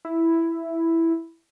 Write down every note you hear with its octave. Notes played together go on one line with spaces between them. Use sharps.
E4